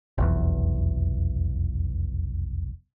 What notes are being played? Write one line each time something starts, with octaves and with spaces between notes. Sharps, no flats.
F1 B1 E2